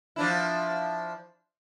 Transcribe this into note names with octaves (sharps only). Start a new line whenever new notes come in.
F3 D4 E4